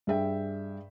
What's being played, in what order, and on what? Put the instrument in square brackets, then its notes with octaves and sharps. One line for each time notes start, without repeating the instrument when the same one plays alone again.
[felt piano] G2 G#4 E5 G5